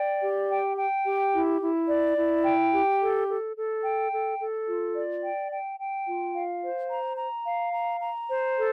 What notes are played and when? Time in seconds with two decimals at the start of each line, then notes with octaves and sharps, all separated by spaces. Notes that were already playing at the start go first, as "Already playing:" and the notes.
Already playing: D5 G5
0.22 G4
0.50 G5
0.77 G5
1.05 G4
1.33 E4
1.61 E4
1.88 D5
2.16 E4
2.44 G5
2.73 G4
3.00 A4
3.28 A4
3.55 A4
3.83 G5
4.12 A4
4.39 A4
4.67 F4
4.95 D5
5.22 G5
5.51 G5
5.78 G5
6.07 F4
6.34 F5
6.62 C5
6.90 A#5
7.17 A#5
7.46 F5
7.73 A#5
8.01 A#5
8.28 C5
8.57 A4